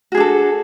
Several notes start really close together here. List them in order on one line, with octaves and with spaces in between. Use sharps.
F#4 G#4 D4 A4